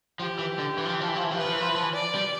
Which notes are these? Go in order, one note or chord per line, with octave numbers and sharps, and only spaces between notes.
F3 G4
E3
D3
E3
F3
E3
F3
E3
F3
E3
F3
E3 B4
F3
E3
F3
E3
F3
E3
D5
G3